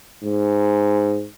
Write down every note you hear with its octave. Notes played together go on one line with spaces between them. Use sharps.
G#2